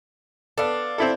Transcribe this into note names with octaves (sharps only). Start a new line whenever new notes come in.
B3 D4 A4 F5
C4 E4 A4